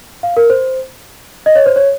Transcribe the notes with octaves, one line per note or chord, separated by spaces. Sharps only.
F5
A#4
C5
D#5
C#5
C5
C#5